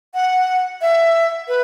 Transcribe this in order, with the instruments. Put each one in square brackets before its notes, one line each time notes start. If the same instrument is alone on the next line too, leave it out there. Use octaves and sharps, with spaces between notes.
[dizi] F#5
E5
B4